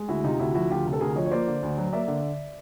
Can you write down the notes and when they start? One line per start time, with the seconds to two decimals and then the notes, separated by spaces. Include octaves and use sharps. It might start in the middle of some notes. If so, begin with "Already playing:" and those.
Already playing: G#3
0.08 D2 E4 F#4
0.24 C3 D#4 F4
0.39 D2 E4 F#4
0.54 F3 E4 F#4
0.70 D2 F4 G4
0.86 C3
0.93 A4
1.00 D2 G#4 A#4
1.16 F3 C#5 D#5
1.26 C#5
1.31 A#3 C5 D5
1.47 D3
1.63 D2
1.78 F#3
1.93 A#3 D5 E5
2.08 D3